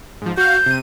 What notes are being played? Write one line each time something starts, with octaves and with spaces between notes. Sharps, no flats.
G#2 F3
F#4 F5 G6
C3 D#7